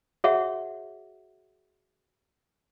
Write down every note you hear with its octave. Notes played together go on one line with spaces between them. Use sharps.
F#4 G#4 C#5 E5 F#5